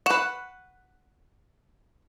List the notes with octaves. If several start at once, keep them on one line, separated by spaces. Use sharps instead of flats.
B4 F#5 C#6 E7